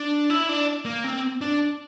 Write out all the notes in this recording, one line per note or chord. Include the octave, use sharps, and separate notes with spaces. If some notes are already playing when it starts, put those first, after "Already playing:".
Already playing: D4
E4
D4
A#3
C4
D4